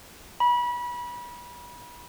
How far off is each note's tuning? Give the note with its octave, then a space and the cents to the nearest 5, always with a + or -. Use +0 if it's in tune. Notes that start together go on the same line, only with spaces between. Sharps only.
B5 -30